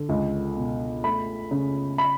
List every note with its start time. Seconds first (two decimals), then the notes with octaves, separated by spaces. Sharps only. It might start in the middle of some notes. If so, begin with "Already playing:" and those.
Already playing: D3
0.09 C#2
0.56 B2
1.04 A3 B5
1.51 C#3
1.98 B5